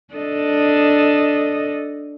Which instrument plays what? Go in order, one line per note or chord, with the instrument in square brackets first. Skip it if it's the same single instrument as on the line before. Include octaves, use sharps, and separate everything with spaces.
[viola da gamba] D4 A4 D#5